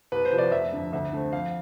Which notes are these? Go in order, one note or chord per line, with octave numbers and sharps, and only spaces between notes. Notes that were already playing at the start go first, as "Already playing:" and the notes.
C2 B4
C5
C3 F3
D5
F1 E5
F2 D3
D2 E5
D3 A3 C4
F2 F5